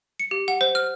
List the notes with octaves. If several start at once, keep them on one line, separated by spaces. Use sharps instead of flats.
C#7
G4
F#5
C5
F6